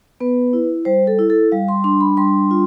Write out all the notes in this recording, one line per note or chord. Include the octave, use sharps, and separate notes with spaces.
B3 B4
E4
G3 C5
A4
E4
A4
G3 F5
C6
D4 C6
B5
G3 C6
F4